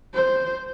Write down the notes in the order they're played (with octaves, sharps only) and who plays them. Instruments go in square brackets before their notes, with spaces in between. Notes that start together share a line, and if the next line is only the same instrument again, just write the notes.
[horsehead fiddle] C5